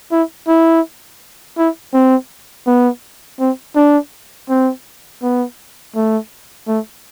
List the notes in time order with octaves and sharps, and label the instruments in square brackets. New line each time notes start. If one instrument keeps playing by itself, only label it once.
[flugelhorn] E4
E4
E4
C4
B3
C4
D4
C4
B3
A3
A3